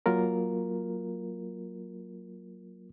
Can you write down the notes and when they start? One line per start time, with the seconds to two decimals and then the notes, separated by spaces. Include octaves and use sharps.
0.06 F#3 A#3 F4 A#4